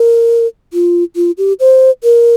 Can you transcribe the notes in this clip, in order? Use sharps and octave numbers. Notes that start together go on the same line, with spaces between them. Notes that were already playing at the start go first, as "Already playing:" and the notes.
Already playing: A#4
F4
F4
G4
C5
A#4